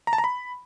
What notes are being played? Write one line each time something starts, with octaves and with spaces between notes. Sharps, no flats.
A#5
A5
A#5
B5